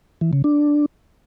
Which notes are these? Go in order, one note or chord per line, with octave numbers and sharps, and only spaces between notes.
E3
C#3
D4